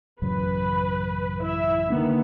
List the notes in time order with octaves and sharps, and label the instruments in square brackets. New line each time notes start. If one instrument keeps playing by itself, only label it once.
[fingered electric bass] A1 F#2 C#3 [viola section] B4
[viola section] E4 E5
[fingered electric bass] D3 A#3 D4 [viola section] D#3 B3